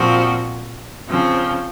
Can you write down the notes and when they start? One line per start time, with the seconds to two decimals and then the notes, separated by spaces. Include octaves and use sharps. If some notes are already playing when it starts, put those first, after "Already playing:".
Already playing: A#2 F3 C4 F#4
1.07 C#3 F3 C4